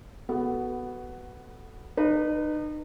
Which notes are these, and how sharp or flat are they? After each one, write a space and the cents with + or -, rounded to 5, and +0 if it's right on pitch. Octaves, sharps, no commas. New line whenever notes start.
B3 +0 F#4 +20 A4 +0
D#4 -35 B4 -10